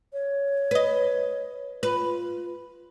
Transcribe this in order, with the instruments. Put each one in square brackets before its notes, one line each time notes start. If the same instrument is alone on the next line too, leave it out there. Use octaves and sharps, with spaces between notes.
[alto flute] C#5
[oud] B4 D#5
[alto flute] F4 [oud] B4